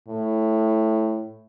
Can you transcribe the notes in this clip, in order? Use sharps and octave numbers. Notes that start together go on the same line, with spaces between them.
A2